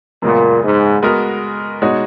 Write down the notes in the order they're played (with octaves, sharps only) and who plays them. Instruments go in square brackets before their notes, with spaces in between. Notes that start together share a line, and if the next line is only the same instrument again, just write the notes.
[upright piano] F#2 C#3 G#3 B3 [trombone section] A#2
[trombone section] G#2
[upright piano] G#3 B3 F#4 A#4
B2 G#3 D#4 F#4 C#5